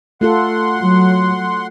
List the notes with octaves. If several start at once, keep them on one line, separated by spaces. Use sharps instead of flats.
A3 F4 A4 F#5 C6
F#3